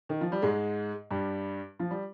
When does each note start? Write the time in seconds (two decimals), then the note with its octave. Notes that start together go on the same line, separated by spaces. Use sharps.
0.09 D#3
0.21 F3
0.32 G3
0.42 G#2 G#3
1.11 G2 G3
1.79 F3
1.91 G3